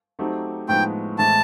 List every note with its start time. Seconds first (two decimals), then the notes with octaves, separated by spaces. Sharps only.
0.19 F#3 A3 C4 D#4 G4
0.68 A2 F3 G#3 B3 D#4 G5
1.18 A2 E3 G#3 C4 E4 A5